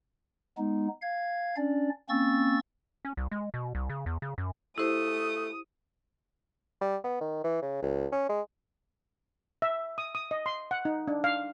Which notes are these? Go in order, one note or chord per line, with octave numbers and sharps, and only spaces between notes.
G#3 B3 D#4
F5 G#6
C#4 D4 D5
A#3 C4 C#4 C#6 E6 A6
C#4
C2
G#3
B2
C2
C#3
E2
C#3
F#2
A3 E4 G4 C5 D#6
G3
B3
D#3
E3
C#3
C#2
C#4
G#3
E5
D#6
D#6
D#5
C6
F#5
D#4
D4
F5